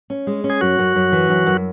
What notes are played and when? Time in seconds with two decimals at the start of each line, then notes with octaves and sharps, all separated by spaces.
0.10 C#4
0.27 G#3
0.44 C#4
0.50 G#4
0.61 F#2 F#4
0.79 F#2
0.96 F#2
1.12 E3
1.30 F#2
1.46 F#2